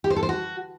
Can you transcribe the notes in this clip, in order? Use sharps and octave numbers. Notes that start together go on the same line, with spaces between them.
G4
C5
A4
C5
F#4